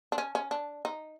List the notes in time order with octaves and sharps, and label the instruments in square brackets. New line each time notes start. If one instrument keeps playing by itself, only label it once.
[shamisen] D4
C#4
C#4
D4
D#4